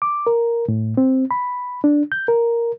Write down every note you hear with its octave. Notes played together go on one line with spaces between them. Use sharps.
D6
A#4
A2
C4
B5
D4
G6
A#4